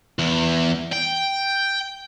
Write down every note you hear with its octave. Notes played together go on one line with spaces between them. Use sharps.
E2
G5